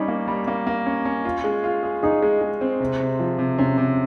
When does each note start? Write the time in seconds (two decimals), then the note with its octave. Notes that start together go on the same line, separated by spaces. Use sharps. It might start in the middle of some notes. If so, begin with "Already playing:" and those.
Already playing: G3 C#4 D#4
0.08 A#3
0.28 G3
0.48 A#3
0.67 A#3
0.86 C#4
1.05 C#4
1.25 F4
1.44 G#3
1.64 F4
1.83 G#4
2.03 D#4 G#4
2.23 G#3
2.41 G#3
2.61 C4
2.80 C3
3.00 C3
3.20 F3
3.39 C3
3.58 C3 C#4
3.78 C3